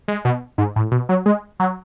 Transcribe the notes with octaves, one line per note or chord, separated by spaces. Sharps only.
G#3
B2
G#2
A2
B2
F#3
G#3
F#3